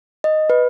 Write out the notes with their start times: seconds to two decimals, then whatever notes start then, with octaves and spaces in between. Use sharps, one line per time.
0.24 D#5
0.50 B4